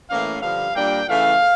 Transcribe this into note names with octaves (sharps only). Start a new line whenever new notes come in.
A2 E3 A#3 C#4 F5
G2 D3 F3 F5
A#2 G3 A#3 D4 G5
C#3 E3 A3 F5